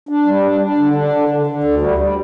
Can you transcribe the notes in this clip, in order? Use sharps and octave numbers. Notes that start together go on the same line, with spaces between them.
D4
G3
D4
D4
D3
D4
D3
D3
D3
D2
G3
G3